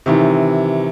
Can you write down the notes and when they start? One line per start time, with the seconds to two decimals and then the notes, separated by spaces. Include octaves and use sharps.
0.06 C3 D#3 E3